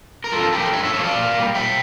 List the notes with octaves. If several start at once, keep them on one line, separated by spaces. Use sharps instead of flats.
A#4
G2 F4 A4
F3 A3 G4 A#4
G2 C#5 E5
C#5 E5
F3 A3 C#5 E5
D5 F5
A#2
G3 A#3
A#2 E5 G5